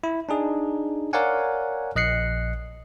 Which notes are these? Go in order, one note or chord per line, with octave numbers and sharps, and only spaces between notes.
E4
D4 D#4 G#4
A#4 C#5 D5 F5 F#5 G#5
A#1 D#5 F#6 C7 C#7